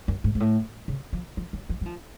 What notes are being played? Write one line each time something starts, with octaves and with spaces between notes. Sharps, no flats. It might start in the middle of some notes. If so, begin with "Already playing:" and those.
F#2
G#2
G#2
A2
C#3
F3
F3
F#3
F3
F#3
F3